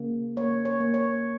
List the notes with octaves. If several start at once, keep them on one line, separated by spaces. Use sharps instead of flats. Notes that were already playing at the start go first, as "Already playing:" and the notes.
Already playing: C#3 A#3
A#3 C#5
C#5
A#3
C#5